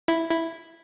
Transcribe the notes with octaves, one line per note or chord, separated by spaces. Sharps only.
E4
E4